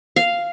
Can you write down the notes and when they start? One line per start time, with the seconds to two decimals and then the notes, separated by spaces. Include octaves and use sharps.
0.16 F5